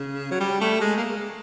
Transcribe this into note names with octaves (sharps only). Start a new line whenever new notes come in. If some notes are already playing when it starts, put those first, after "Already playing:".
Already playing: C#3
F#3
G3
A3
G#3
A#3